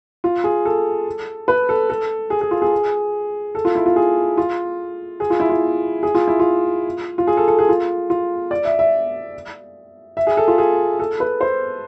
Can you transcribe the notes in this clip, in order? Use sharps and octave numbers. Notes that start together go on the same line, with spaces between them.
F4
G#4
A4
B4
A4
A4
G#4
G#4
F4
G#4
A4
F4
E4
F4
G#4
F4
G#4
F4
E4
F4
G#4
F4
E4
F4
F4
G#4
A4
A4
G#4
F4
F4
D5
E5
E5
E5
G#4
A4
F4
G#4
A4
B4
C5